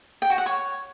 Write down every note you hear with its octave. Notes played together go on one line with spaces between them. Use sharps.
G5
F#4
F#5
C#5